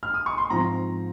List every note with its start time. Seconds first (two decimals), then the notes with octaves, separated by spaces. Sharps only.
0.03 F6
0.14 D#6
0.26 C#6
0.38 C6
0.50 G#2 F3 C4 A#5